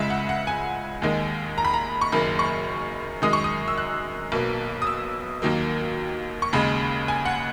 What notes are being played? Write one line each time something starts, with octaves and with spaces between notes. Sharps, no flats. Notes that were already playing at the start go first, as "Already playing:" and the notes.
Already playing: C#2 C#3 G#3 E5
F#5
F#5
G#5
D#2 D#3 G#3
A#5
B5
A#5
C#6
F#1 F#2 D#3 A#3 B5
C#6
F#2 D#3 G#3 D#6
C#6
D#6
E6
F#6
B1 B2 A#3
D#6
E6
D#2 D#3 F#3 A#3
C#6
D#2 C#3 G#3 B5
G#5
F#5